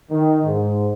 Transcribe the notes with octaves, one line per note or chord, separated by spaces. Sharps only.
D#3
G#2